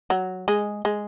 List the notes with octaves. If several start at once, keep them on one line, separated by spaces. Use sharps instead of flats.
F#3
G#3
G#3